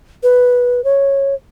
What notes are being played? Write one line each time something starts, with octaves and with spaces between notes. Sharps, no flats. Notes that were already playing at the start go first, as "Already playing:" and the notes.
B4
C#5